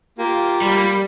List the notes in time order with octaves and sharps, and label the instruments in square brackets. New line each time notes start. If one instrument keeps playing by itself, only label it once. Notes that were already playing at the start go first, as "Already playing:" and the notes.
[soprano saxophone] A#3 [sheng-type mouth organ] F4 G4
[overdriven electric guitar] G3 [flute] B5